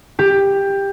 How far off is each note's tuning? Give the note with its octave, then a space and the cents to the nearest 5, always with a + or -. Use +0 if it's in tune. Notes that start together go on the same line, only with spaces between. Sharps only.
G4 +15